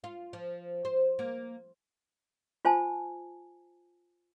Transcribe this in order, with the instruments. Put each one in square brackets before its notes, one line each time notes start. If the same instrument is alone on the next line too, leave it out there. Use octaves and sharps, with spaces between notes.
[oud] F4
F3
C5
A#3
[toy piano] F4 C5 G#5 A5